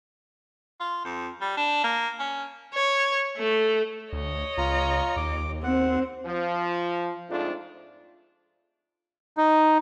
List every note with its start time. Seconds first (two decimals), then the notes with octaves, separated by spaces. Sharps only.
0.80 F4
1.05 F2
1.41 G3
1.57 D4
1.84 A#3
2.19 C#4
2.74 C#5
3.37 A3
4.13 D2 C#5 D#5
4.58 C#2 F4 A#5
5.16 D#2 D6
5.64 C4 F#5
6.25 F3
7.29 F2 G#2 F3 A3 D4 F4
9.37 D#4